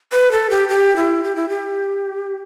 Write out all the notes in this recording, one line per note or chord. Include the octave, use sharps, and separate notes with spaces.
B4
A4
G4
G4
E4
G4
E4
G4